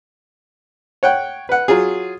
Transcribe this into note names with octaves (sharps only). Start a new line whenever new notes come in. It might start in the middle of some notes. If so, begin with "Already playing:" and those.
C#5 F#5 G5
B4 F#5
F#3 F4 G#4